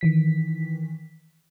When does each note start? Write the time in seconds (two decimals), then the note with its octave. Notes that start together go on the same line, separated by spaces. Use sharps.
0.01 D#3 E3 B6